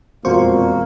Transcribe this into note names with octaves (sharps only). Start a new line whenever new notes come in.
E1 F2 A#2 A#3 F#4 C5 C#6